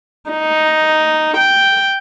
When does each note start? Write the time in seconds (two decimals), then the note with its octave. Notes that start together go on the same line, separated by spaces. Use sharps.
0.30 D#4
1.37 G5